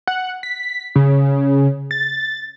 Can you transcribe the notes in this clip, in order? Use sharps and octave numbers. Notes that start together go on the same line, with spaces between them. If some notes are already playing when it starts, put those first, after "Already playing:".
F#5
B6
C#3
A6